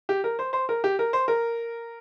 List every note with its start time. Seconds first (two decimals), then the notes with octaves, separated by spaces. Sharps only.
0.09 G4
0.24 A#4
0.39 C5
0.53 C5
0.69 A#4
0.84 G4
0.99 A#4
1.13 C5
1.28 A#4